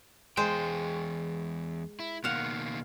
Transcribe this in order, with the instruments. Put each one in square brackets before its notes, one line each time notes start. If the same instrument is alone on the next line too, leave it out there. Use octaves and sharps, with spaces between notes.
[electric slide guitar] E2 A#3 G5 [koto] G#3 C5
[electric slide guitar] E4
[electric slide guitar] B2 D#3 A#3 [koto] F5 F#5